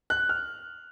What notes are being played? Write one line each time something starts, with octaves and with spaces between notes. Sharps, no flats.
F#6
F6